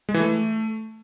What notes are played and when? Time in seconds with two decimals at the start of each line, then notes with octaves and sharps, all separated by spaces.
0.09 G#3
0.14 E3
0.20 A3